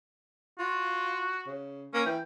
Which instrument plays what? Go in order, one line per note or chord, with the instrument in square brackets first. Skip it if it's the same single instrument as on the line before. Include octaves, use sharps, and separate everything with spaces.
[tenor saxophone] F4 [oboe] F#4
[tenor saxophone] C#3
[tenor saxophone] A#3 [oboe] C#4
[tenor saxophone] E3 [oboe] G5